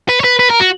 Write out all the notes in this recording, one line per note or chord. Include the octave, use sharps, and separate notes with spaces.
B4
C#5
B4
B4
A#4
F#4